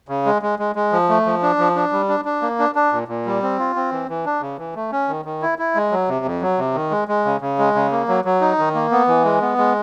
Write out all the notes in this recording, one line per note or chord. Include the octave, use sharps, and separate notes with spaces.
C#3
G#3
G#3
G#3
G#3
F3
A3
F3
D4
F3
D4
G3
D4
D4
A#3
D4
D4
A#2
A#2
G3
C4
F4
C4
E3
E3
D4
C#3
E3
A3
C#4
D#3
D#3
E4
E4
G#3
F#3
C3
F2
F#3
C3
D#3
G#3
G#3
C#3
C#3
G#3
C#3
A#3
F#3
F#3
D#4
D#3
A#3
B3
E3
G#3
B3
G#3